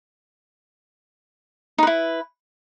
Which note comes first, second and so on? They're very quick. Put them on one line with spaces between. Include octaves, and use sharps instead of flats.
D#4 B4 E4